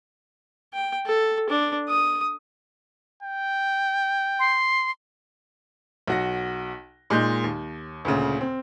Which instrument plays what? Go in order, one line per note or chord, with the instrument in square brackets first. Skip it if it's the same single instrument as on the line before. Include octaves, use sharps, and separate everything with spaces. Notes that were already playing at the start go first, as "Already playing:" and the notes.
[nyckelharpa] G5
A4
D4
D#6
[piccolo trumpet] G5
[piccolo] C6
[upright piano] B1 F#4 A#6
A#2 G#3 D#4 G6
D#2
D2 A#2 C#3
C4